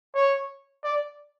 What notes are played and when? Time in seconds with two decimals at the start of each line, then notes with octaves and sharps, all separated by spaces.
0.15 C#5
0.84 D5